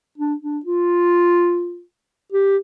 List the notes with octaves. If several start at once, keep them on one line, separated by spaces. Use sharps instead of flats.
D4
D4
F4
G4